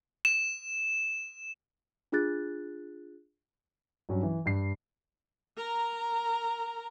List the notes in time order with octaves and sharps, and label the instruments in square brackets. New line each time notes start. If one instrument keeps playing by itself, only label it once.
[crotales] E7
[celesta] D4 F4 G#4 F#6 A6
[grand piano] G2 F#3 C#4
E3
G2 C7
[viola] A#4 A#5